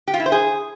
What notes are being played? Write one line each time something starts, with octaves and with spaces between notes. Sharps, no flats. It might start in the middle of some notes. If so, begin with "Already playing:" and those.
G4
F4
E4
C5
G#4